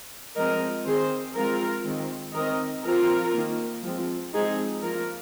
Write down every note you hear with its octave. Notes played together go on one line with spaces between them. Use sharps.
F3 G#3 C4 A#4 D#5
D#3 C4 G#4 C5
F3 G#3 C4 F4 A#4
D#3 G#3 C4
D#3 C4 A#4 D#5
F3 C4 F4 A#4
D#3 A#3
F3 G#3 C4
F3 G#3 C4 D#4 G#4
F3 A#3 F4 A#4